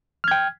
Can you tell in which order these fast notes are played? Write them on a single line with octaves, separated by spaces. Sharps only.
F6 G#6 G5